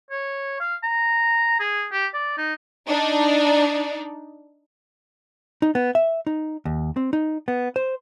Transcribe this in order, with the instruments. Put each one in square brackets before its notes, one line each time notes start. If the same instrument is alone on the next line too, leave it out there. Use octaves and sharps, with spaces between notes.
[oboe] C#5
F5
A#5
G#4
G4
D5
D#4
[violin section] D4 D#4
[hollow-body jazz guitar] D#4
B3
E5
D#4
D#2
C4
D#4
B3
C5